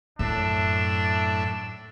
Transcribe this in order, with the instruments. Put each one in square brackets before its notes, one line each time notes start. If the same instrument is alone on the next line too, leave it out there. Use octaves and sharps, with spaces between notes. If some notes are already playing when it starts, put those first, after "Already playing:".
[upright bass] F#2 [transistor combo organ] A2 E5 [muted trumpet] D4